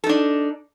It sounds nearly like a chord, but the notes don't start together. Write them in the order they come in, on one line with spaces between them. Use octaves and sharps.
A4 D#4 D4